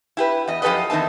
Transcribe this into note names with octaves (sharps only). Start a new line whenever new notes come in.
E4 G4 B4
E2 D#5
F#2 F3 G4 A4 B4 D#5
E2 D#3 C4 D#4 E5 A5